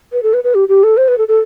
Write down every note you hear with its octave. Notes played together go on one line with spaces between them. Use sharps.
B4
A4
B4
B4
G4
G4
A4
C5
B4
A4
A4